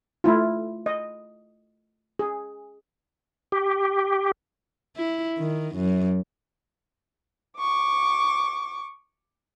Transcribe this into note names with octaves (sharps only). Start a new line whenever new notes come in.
A3 E4 F4
D#5
G#4
G4
E4
D#3
F#2
C#6 D6